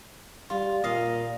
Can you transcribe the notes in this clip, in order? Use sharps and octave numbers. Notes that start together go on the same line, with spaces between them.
G3 F4
A#2 D#5 F5